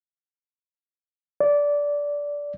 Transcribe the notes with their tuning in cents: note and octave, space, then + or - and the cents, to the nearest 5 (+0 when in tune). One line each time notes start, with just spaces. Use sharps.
D5 -15